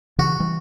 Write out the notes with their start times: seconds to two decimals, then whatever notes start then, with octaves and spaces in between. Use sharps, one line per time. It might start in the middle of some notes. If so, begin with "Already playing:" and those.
0.18 C#3 E3 F#4
0.40 E3 G3